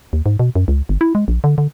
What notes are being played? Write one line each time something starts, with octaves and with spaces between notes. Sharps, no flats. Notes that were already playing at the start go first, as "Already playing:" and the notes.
D#2
G#2
B2
F#2
C#2
G1
E4
G#3
A#1
D3
D3